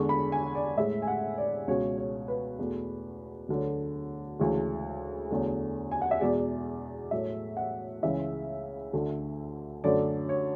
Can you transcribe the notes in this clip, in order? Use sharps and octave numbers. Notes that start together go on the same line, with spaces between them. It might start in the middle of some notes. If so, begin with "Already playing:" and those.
Already playing: E2 D3 G#3 C#6
B5
G#5
D5
A2 G#3 E5
G#5
F#5
D5
C#2 B2 G#3 C#5
C#5
B4
E2 B2 A3
D2 D3 F#3 A3
D2 C#3 E3 G#3
E2 D3 F#3 A3
G#5
F#5
E5
E2 B2 G#3 D5
A2 F#3 A3 E5
F#5
C#2 C#3 E3 G#3 E5
D2 D3 A3
F#2 D3 F#3 A3 D5
C#5